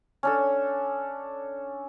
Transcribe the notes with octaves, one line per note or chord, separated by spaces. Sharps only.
C#4 D4 A4